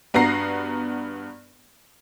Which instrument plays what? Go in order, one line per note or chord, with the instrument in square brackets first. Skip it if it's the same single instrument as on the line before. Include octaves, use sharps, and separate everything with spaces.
[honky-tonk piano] G2 B3 F#4 A#5 A#6 C7